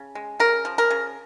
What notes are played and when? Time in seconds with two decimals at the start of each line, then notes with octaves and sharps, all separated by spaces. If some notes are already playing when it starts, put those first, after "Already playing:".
Already playing: C#3
0.15 G#3
0.40 C#3 A#4
0.65 F3
0.78 A#4
0.90 C#3